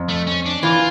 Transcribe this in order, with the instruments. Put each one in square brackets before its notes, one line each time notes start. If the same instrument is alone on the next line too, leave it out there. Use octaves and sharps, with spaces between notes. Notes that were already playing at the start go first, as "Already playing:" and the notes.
Already playing: [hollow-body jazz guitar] F2
[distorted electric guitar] A3
C#4
D4
[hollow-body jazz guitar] E3 [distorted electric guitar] F4